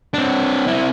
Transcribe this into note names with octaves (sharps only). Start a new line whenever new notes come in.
C4 D4
C4 E4